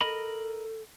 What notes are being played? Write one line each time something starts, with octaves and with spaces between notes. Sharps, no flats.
A4 A#4 D#5 B5